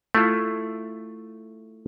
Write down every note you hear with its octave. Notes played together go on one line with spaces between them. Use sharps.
A3 E4 F4 A4